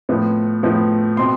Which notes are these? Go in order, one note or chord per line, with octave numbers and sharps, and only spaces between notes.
A2 F3 B3
A2 F3 B3
B2 A3 C4 C6